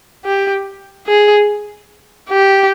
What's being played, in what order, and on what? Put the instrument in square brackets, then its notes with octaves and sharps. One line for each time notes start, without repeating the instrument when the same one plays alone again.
[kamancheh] G4
G#4
G4